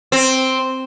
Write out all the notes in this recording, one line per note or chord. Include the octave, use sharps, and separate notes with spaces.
C4